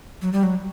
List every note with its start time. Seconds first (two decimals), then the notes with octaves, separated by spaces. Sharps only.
0.22 F#3
0.33 G3
0.43 F#3